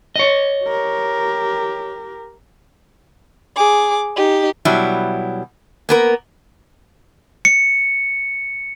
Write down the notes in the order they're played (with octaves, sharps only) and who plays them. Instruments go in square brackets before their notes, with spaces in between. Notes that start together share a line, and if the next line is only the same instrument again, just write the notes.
[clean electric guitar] C#5 D#5
[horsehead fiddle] G4 A#4
[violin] G#4 D6
D#4 G4
[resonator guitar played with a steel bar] B2 F#3 G3 E4
A#3 B3 A#4
[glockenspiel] C#7